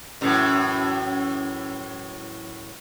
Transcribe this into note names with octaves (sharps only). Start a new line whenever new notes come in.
F#2 A2 E3